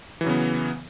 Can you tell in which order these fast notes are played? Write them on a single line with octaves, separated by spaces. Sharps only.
E3 F#3 C#3 B3